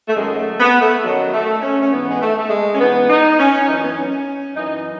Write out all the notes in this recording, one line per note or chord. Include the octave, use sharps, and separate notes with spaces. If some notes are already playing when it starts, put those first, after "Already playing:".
A3
F#2 D#3 F#3 G#3
A3
B3
A3
F#2 D#3 F#3
A3
C#4
C#4
G#2 E3 B3
G#3
A3
A3
G#3
C#4
G#2 E3 B3
D#4
C#4
F#2 E3 D#4
C#4
B3
C#4
F#2 E3 D#4